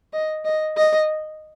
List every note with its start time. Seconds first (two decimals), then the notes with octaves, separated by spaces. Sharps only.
0.13 D#5
0.45 D#5
0.77 D#5